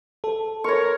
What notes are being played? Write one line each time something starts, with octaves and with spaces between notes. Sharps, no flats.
A4
A#4 C#5 C#6